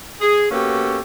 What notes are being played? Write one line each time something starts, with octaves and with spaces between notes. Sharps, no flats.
G#4
A#3 B3 C#4 F#4 G4 A4